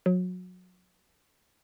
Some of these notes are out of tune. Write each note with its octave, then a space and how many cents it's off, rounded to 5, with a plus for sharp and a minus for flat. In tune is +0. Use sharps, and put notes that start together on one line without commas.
F#3 -25